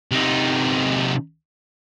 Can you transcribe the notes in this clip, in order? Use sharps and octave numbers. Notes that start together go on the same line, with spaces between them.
C3 D#4